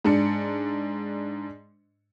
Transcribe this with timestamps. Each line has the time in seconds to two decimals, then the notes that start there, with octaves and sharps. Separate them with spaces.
0.04 G#2 D4 C#7